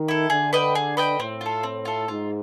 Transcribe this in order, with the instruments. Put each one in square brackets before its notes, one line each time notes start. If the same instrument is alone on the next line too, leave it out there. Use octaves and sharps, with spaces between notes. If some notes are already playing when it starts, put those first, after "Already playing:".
Already playing: [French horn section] D#3
[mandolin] E4 A4
[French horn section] D3 [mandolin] G#4
[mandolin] B4 D#5 G5
G#4
B4 D#5 G5
[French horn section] A2 [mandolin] C4
[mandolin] F4 A4
C4
F4 A4
[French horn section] G#2 [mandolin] F4